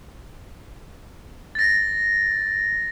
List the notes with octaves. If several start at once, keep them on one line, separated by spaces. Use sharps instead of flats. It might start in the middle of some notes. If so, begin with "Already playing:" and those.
A6 A#6